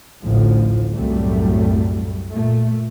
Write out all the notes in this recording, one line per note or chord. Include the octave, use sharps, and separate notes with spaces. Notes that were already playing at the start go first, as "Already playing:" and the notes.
A1 D2 A2 F3
C2 F#2 A2 F#3 G3 A3
A#2 A3